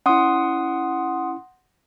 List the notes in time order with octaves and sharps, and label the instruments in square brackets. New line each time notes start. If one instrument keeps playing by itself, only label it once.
[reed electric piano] C#4 E4 [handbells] F#5 C6 D#6